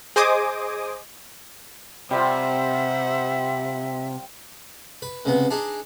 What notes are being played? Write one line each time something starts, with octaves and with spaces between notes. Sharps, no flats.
G#4 C5 D#5 G#5 D6 D#6
C3 G3 C4 F4 C5 E5 F#5
B4
C#2 C3 B3
D4 D#4 G#4